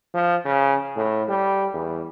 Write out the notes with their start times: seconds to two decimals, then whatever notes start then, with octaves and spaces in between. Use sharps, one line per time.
0.14 F3
0.45 C#3
0.97 A2
1.29 G3
1.74 E2